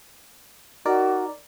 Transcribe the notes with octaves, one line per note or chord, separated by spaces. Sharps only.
D#4 F#4 A#4 D5